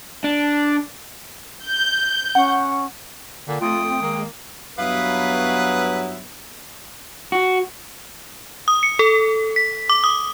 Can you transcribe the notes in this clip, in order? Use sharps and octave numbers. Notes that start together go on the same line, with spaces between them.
D4
G6
C#4 F#5
A#2 D3
F2 A3 F4 G5 D#6
C4
D#3 G#3 A#3
G2 F#3 B3 E4 B4 F5 D#6
F#4
D#6
C#7
A4
B6
D6
D#6